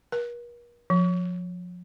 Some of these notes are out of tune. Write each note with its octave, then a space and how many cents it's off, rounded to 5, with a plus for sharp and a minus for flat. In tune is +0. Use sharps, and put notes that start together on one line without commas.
A#4 +45
F3 +30